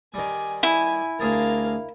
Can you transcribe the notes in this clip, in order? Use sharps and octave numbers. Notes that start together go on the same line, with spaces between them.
D#3 G3 G#5
E4 G#5
D2 G#4 A#4 F5 A5